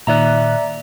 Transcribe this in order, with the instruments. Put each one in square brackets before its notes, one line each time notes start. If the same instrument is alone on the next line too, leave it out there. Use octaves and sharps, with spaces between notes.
[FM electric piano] A#2 D#3 F#6 [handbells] D5 E5 A#5